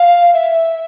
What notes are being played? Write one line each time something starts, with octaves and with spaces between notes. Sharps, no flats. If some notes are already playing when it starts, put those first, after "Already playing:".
Already playing: F5
E5